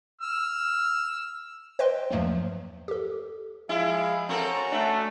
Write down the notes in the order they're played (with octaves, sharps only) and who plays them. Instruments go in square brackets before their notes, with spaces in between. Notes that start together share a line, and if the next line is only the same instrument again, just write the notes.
[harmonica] E6 F6
[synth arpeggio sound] B4 C5 D#5 G5 C6
E2 G2 F3 F#3 A3 A#3
G4 A4
[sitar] F3 E4 [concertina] G#3 G#4 F5
[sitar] C4 A4 A#4 [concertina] C#4 F#4 A#5
[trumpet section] A3 [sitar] D4